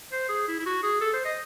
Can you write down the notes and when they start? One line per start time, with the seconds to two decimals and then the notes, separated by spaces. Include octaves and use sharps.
0.12 C5
0.29 G#4
0.48 E4
0.59 E4
0.66 F#4
0.83 G#4
1.01 A4
1.14 C5
1.25 D#5